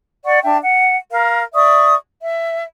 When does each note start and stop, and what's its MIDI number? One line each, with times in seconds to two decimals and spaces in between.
0.25 0.40 74
0.25 0.40 78
0.25 0.40 85
0.43 0.57 62
0.43 0.57 76
0.43 0.57 79
0.43 0.57 81
0.62 0.94 78
1.11 1.44 70
1.11 1.44 77
1.54 1.95 74
1.54 1.95 76
1.54 1.95 85
1.54 1.95 87
2.21 2.62 76